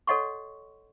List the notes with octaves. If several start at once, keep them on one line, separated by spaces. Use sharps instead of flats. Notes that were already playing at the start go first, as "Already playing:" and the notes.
A4 C#5 D#5 F#5 C6 C#6